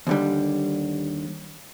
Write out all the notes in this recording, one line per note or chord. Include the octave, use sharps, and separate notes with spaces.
D#2 D3 G3